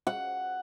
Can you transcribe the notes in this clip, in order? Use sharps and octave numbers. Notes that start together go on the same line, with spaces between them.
F#5